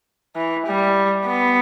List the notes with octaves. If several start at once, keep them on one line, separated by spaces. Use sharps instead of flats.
E3
G3
B3